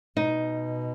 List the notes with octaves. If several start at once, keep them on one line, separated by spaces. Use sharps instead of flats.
B2 D#4